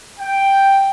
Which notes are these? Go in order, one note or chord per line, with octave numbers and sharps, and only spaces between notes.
G5